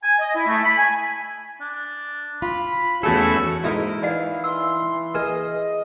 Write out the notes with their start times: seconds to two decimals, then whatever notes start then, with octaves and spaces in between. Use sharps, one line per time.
0.02 G#5
0.19 D#5
0.36 E4
0.47 A3
0.64 B5
0.77 G#5
1.61 D4
2.42 F4 B5
3.03 E2 A3 C#4 E4 F#4 G#4 A4
3.64 G#2 D#4 E4 A#4
4.03 E3 D5 D#5 F5 F#5
4.44 C6 E6
5.15 G#4 B4 D#5